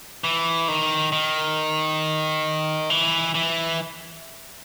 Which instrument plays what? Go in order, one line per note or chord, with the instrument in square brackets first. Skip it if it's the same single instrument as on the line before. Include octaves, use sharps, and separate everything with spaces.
[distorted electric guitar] E3
D#3
D#3
E3
E3